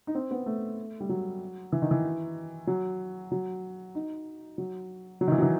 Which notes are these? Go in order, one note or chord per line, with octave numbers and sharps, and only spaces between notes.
D#4
C4
B3
A3
G3
F#3
E3
D#3
E3
F#3
F#3
D#4
F#3
F#3
D#3
E3
F#3
E3